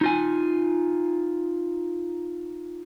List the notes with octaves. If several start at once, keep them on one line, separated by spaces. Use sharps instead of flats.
D#4 F4 G#5